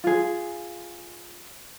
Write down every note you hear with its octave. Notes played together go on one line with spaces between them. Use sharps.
F4 G#4